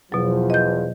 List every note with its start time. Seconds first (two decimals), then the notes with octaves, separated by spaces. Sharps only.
0.12 E2 B2 F3 F#3
0.50 D#5 G6